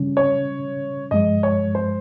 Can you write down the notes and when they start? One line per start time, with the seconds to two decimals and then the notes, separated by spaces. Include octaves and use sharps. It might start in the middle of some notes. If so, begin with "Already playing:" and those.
Already playing: C#3 G3 C#4
0.17 C#5
1.11 G2 F3 G#3 D#5
1.43 C#5
1.75 C5